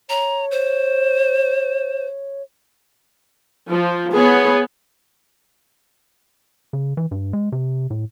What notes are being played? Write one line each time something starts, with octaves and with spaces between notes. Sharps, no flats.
C#5 A#5
C5
F3
B3 G#4 C#5
C#3
E3
G2
G#3
C3
A2